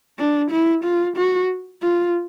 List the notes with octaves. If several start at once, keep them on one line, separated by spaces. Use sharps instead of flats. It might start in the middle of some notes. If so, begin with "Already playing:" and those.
D4
E4
F4
F#4
F4